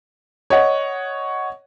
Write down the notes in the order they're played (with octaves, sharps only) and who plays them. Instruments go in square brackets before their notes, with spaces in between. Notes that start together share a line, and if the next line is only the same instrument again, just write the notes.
[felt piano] C#5 D#5 F#5